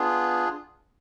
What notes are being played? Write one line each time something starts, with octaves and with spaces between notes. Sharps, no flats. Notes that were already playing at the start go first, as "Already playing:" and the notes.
Already playing: B3 D4 F4 G#4